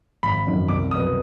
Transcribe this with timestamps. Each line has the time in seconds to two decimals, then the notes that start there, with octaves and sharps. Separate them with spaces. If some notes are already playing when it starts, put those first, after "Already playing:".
0.23 G#1 B5
0.47 F#2 D#3 F#3
0.68 C2 D6
0.91 B2 F#3 B3 D#6